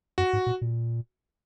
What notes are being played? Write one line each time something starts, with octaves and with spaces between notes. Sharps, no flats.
F#2 F#4
G#2
A#2
A#2